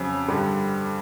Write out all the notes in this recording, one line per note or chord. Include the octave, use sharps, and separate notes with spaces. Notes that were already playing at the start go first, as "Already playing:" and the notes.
Already playing: F2 C#3 F#3
G2 D3 G3